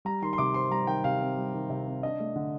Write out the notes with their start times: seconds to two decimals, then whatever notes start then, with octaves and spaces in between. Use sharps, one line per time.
0.05 G3 A#5
0.22 D#3 C6
0.33 C6
0.38 C3 D6
0.54 C4 C6
0.71 G3 A#5
0.87 D#3 G5
1.04 C3 F5
1.21 C4
1.37 G3
1.54 D#3
1.70 C3
1.87 C4
2.03 D4 D#5
2.20 A3
2.36 D3